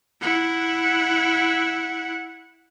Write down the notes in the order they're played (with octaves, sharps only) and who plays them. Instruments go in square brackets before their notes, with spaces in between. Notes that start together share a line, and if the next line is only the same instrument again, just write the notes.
[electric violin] E4 F#5